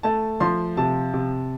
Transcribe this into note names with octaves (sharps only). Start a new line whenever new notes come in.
A3 A5
F3 C6
C3 A5
C3